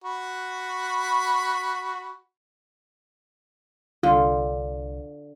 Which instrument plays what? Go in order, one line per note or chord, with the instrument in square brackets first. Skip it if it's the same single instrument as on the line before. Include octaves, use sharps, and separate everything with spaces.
[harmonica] F#4 B5
[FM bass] C2 [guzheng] D3 [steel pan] F4